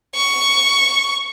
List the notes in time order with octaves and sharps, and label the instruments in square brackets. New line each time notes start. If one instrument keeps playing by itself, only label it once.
[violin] C#6